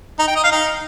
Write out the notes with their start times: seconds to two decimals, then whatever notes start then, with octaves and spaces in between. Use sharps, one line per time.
0.19 D#4
0.27 G5
0.35 D#5
0.43 F5
0.52 D#4